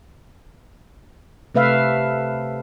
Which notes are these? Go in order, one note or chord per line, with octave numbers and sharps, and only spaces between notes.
C3 A3 B4 E5 F5